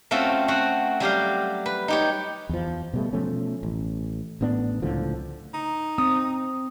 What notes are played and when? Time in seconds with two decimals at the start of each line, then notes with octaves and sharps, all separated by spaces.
0.11 A3 C4 C#4 F4 F#4 A4
0.48 C4 F#4 F#5
1.00 F#3 G3 G4 F5
1.66 B4
1.88 D#4 G4 C#5
2.49 E2 F3
2.93 B2 G3 A3
3.13 B2 F3 A3 C#4
3.63 A1
4.41 A1 A2 B3 D4
4.82 C#2 A2 D3 F3
5.54 D#4
5.98 C4 D#6